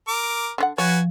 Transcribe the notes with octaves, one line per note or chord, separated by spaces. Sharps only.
A#4 D6
D3 C#4 F#5
F3 F#4 B4 C#5 G#5